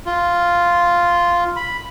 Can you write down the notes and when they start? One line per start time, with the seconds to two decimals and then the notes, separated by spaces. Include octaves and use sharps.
0.06 F4
1.56 B5